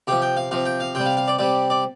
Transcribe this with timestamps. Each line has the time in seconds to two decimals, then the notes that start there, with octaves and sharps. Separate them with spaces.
0.07 C3 F3 G4
0.22 G5
0.37 F5
0.51 C3 F3 F5
0.65 G5
0.80 F5
0.95 C3 G3 G5
1.06 F5
1.17 F5
1.28 D5
1.38 C3 G3 D5
1.70 D5